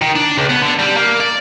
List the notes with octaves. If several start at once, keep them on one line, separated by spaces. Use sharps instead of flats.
D#3
D4
C#2
B3
D3
G3
A#3
D5